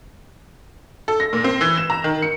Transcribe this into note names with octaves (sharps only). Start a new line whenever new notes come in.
A4
A#6
A#2
C4
E3
E7
A#5
D#3
C#7